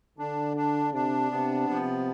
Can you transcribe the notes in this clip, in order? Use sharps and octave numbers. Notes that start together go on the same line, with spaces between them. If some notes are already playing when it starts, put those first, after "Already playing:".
D3 D4
D4
C3 D4
C3 B3
C3 F3